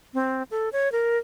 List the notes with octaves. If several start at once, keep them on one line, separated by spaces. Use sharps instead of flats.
C4
A4
C#5
A#4